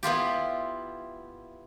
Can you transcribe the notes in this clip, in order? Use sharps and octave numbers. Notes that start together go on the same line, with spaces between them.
B3 E4 F4 G4